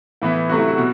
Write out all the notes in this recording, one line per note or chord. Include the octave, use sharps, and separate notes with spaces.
A2 E3 B3 E4
C3 F#3 A3 F#4
E4
F#4
B2